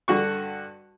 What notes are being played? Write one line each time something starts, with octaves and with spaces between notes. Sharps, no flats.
G2 D3 F#4 C#6